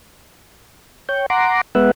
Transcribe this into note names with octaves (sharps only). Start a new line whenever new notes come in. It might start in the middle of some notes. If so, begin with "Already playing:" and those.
C#5 G5
F#5 A#5 C6 D6
G#3 B3 B4 E5 F#5